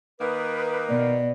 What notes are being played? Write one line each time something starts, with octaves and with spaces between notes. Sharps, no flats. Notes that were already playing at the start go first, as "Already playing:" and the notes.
D#3 A#3 B4 D#6
B2 D5